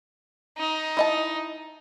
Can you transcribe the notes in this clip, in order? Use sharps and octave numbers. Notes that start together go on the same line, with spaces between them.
D#4
E4 D#5 A5